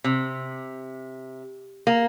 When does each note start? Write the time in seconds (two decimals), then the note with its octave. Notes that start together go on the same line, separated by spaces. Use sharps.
0.04 C3
1.87 A#3